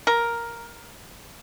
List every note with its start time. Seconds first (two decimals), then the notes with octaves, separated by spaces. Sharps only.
0.07 A#4